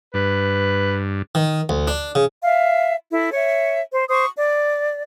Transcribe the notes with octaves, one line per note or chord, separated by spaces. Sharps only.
G2 B4
D#3
D2
D4
C#3
E5 F5
E4 A4
C#5 E5
C5
C5 C#6 D#6
D5